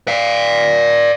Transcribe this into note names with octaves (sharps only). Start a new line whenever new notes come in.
D5 F5